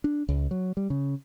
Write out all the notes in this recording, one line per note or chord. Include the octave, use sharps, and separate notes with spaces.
D4
C#2
F#3
G3
C#3